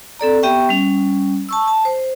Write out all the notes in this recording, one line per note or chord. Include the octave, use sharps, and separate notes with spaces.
C4 A4 D5 A#5
B3 G4 E5 G5 C#6
G3 C#4
A5 C#6 E6
A5
C5